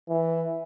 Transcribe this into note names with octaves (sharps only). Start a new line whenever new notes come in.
E3